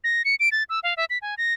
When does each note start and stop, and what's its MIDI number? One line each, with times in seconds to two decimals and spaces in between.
0.04 0.22 94
0.25 0.35 97
0.40 0.49 98
0.52 0.63 93
0.69 0.80 88
0.83 0.94 77
0.97 1.05 76
1.10 1.18 95
1.22 1.35 80
1.38 1.54 94